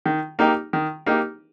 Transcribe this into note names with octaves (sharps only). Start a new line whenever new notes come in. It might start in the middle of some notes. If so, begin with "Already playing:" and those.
D#3
A#3 D#4 G4
D#3
A#3 D#4 G4